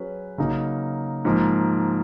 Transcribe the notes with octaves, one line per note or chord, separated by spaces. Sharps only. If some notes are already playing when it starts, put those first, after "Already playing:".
Already playing: F#3 C#4 G#4 B4
C#3 F#3 A#3 D#4
G#2 F3 A#3